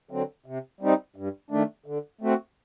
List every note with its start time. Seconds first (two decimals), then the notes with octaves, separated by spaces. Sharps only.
0.11 D3 F#3 C4
0.46 C3
0.81 G3 C4 D#4
1.16 G2
1.50 D#3 A3 D4
1.86 D3
2.21 A3 C4 F#4